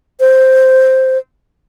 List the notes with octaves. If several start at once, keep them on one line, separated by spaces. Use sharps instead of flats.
C5